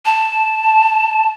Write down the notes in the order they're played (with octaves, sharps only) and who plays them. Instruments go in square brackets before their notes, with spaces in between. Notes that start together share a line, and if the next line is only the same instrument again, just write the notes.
[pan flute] A5